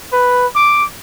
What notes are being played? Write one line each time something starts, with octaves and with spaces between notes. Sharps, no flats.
B4
D6